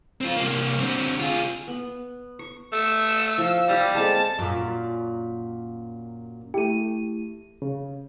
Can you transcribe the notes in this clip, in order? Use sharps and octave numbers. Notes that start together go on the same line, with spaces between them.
C4 F4
C2 A#3
D3 C4
F4 G#4
B3
C#6
A3 E6
F3 F5
G3 G4 D6
G#3 C4 A4 A5
F#2 A#2
A3 E4 G4 D#7
C#3